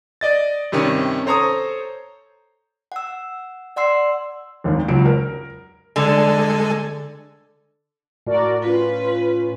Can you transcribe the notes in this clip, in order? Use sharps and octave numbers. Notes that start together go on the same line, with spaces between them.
D5 D#5 A6
G2 C3 D#3 C#4
A4 C5 C#5 A#5 C#6 D#6
F#5 E6
D5 F#5 C6 E6 C7
G#1 D#2 D#3
C#2 F#3 D7
A#4
D3 G#3 A4 G#5
A2 F#4 A#4 D5
C#4 F4 B4